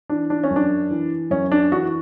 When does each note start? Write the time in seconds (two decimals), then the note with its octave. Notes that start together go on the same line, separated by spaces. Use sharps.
0.09 E3 D4
0.30 D4
0.44 C#4
0.50 F#2
0.56 D4
0.91 E3
1.30 F#2 C#4
1.52 D4
1.72 E3 F#4